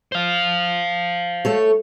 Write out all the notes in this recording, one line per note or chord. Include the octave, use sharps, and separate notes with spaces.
C5 F5
A3 A4 C#5